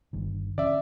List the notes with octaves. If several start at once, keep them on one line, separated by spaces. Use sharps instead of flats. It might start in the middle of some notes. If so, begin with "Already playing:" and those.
G1 G2 D#3
D3 E3 C#4 D5 E5